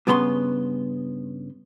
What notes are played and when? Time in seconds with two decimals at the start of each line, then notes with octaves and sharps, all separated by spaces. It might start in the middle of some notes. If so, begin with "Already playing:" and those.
0.07 G2 C#3 B3 B5 C6